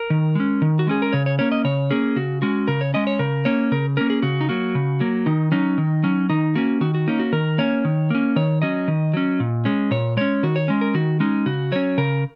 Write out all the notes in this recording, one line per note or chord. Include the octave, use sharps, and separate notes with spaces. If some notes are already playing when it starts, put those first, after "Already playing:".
Already playing: A#4
D#3
G#3 C#4
D#3
F#4
G#3 C#4 G#4
A#4
C#3 C#5
C#5
A#3 C#4 C#5
D#5
C#3 C#5
A#3 C#4 G#4
C#3 F#4
G#3 C#4 F#4
C#3 A#4
C#5
G#3 C#4 D#5
C#5
C#3 A#4
A#3 C#4 C#5
C#3 A#4
A#3 C#4 A#4
G#4
C#3 F#4
D#4
F#3 A#3 F#4
C#3
F#3 A#3
D#3 D#4
F#3 C#4 D#4
D#3
F#3 C#4
D#3 D#4
A#3 C#4 F#4
D#3 F#4
F#4
A#3 C#4 D#4
F#4
D#3 A#4
A#3 C#4 C#5
D#3
A#3 C#4
D#3 C#5
F#3 C#4 D#5
D#3
F#3 C#4
A#2
G#3 C#4
A#2 C#5
G#3 C#4 C#5
D#3 F#4
C#5
G#3 C#4
A#4
D#3 F#4
G#3 C#4 D#4
C#3 F#4
F#3 C#4 C#5
C#3 A#4